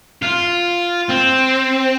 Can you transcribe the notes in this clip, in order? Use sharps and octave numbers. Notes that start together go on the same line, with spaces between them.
F4
C4